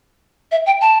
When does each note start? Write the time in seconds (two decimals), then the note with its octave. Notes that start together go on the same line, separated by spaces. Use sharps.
0.52 E5
0.66 G5
0.81 A5